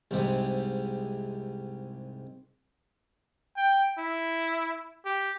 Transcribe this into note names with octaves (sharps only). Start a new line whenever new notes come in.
C2 G#2 C3
G5
E4
G4